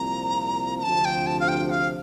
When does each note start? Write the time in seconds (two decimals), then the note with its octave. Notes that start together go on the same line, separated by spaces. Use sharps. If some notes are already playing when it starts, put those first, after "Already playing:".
Already playing: C2 A#2 F3 C4 A#5
0.79 A#5
0.83 D2 C3 F3 A5
1.05 G5
1.27 A5
1.40 F5
1.48 G5
1.70 F5